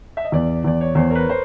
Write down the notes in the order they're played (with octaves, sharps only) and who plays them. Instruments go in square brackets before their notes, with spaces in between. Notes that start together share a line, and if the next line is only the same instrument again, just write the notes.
[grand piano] E5
D#5
[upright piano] E2 [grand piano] D5
[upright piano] E2 [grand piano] D5
[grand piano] C#5
[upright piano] E2 [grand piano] C5
[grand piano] A#4
B4
C5